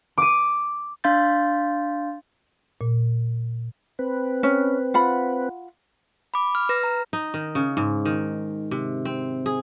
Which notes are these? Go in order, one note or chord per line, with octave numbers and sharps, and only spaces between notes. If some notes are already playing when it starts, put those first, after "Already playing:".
D6 D#7
D4 F5 C6 G6 A6
A#2
C4 B4
C#4
F4 F#5 B5
B5 D6
F6
B4 F6 A#6
A#5
D#4
D#3
C#3
G#2
D#3
C3
C4
G#4